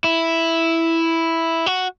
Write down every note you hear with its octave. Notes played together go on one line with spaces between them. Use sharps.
E4
F#4